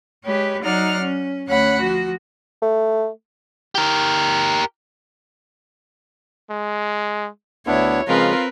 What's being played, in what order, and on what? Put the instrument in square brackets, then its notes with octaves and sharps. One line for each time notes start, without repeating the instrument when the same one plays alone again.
[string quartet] G#3 G4 B4 C#5
F#3 D#4 D5 F#5 C6 F6
C#4
D2 C#4 C#5 F#5 B5 F#6
F3 F#4
[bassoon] A3
[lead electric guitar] G4 A#4
[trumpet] G#3
[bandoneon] D2 B3 D4 [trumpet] E4 [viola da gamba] C#5
[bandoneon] C#3 F3 G#3 [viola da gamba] C4 A#4 B4 [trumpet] F4